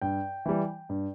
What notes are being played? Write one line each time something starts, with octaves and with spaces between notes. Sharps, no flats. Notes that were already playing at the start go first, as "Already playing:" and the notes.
G2 G5
E3 G3
G2